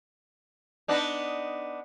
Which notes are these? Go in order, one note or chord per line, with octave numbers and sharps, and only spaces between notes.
B3 D4 D#4